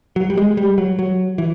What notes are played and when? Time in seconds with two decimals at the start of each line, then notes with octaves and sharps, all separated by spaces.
0.16 F#3
0.30 G3
0.37 G#3
0.57 G3
0.78 F#3
0.99 F#3
1.38 E3